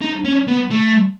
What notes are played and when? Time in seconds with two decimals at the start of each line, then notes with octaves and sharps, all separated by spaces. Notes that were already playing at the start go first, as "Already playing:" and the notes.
0.02 D#4
0.25 C#4
0.48 B3
0.71 A3